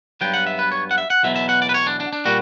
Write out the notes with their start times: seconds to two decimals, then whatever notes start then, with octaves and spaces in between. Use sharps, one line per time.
0.21 G2 F#3 B3 G5
0.34 F#5
0.47 E5
0.59 B4
0.72 C#5
0.91 F#5
0.98 E5
1.10 F#5
1.23 E2 B2 F#3 B3 E5
1.36 E5
1.49 F#5
1.62 D5
1.69 B4
1.74 C#5
1.87 D4
2.00 D4
2.13 D4
2.25 A#2 G3 F#4